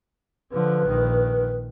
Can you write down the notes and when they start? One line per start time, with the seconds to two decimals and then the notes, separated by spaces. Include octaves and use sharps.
0.52 D3 F3 B4
0.85 A#1 D#3